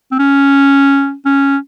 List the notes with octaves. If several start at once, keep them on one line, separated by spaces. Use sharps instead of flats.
C4
C#4
C#4